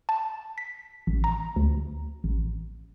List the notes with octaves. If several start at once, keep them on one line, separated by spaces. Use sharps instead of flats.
A5
B6
A1
A#5
D2
A1